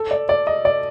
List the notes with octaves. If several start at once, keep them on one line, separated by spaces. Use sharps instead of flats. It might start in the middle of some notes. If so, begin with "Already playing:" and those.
Already playing: A4
D5
D5
D#5
D5